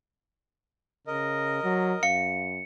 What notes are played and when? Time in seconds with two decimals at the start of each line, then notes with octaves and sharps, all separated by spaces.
1.07 C#3 A#4 D#5
1.64 F#3
2.03 F#2 F5 C#7